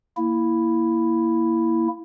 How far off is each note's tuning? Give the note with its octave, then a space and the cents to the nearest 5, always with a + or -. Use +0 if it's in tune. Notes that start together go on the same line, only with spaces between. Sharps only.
A#3 +0 E4 +0